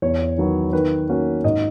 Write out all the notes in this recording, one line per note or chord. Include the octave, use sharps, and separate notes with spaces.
E2 C#5
D#3 F#3 B3
D#3 B4
A#3 C#4 F#4
G#2 D#5